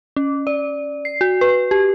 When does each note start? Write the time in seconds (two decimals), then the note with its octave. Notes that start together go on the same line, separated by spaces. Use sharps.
0.16 C#4
0.47 D5
1.05 C7
1.21 F#4
1.41 B4
1.71 G4